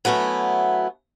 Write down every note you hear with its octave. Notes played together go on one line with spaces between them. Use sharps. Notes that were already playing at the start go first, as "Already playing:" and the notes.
F#3 A3 B3 C#4 E4